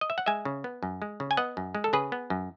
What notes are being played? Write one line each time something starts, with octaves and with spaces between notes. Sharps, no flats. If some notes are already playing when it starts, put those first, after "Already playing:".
D#5
E5
F#5
G#3 E5 G#5
C#3
B3
F#2
G#3
C#3
G#5
B3 D#5 F#5
F#2
G#3
A4
C#3 G#4 B4
B3
F#2